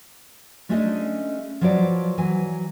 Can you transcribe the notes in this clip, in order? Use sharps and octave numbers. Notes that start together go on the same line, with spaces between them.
G#3 A3 C#4 D4 G#4 D#5
F3 F#3 B4 C#5 D5
E3 F#3 G#5